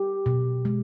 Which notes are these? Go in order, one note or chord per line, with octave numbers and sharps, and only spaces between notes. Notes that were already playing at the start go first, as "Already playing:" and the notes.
Already playing: G4
B2
G#3